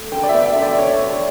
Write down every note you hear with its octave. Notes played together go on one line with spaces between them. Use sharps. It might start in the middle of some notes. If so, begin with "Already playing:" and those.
Already playing: A3
D3 G5
D5
B3 E5
E5
D3
D5
D3 C#5
D3